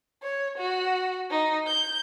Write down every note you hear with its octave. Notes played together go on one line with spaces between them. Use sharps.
C#5
F#4
D#4
G6